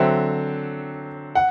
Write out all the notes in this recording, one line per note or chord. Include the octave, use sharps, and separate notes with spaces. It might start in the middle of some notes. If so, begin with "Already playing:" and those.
Already playing: D3 F#3 C4 E5
F#5